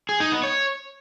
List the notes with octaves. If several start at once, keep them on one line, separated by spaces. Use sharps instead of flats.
G#4
D#4
B3
C#5